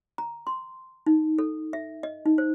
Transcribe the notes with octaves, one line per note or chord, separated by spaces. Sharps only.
A#5
C6
D#4
A4
E5
D#5
D#4
C5